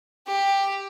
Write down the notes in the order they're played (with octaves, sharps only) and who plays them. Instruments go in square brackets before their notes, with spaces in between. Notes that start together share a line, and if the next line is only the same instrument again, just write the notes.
[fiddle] G4